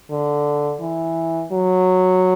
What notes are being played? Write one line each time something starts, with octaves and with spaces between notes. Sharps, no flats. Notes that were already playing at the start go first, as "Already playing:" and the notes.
D3
E3
F#3